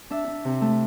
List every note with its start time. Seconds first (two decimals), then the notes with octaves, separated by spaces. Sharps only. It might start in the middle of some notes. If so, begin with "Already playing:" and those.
0.10 D4 E5
0.27 D4
0.45 C3
0.61 A3